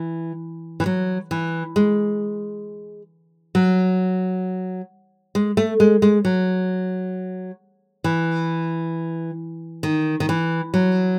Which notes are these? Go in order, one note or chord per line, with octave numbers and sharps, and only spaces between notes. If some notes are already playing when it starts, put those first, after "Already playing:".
Already playing: E3
E3
F#3
E3
G#3
F#3
G#3
A3
G#3
G#3
F#3
E3
D#3
D#3
E3
F#3